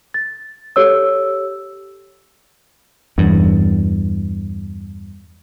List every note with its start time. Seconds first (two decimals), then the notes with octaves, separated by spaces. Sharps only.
0.14 A6
0.76 G4 A4 C#5 E6
3.18 E2 G2